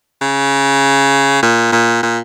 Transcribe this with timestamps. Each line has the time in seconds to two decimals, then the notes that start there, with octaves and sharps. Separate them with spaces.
0.22 C#3
1.42 A#2
1.72 A#2
2.03 A#2